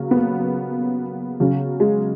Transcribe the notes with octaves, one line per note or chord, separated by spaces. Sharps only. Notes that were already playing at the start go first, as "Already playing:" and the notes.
Already playing: C#3 F#3 A#3
B3
A#3
C#3 F#3
G#3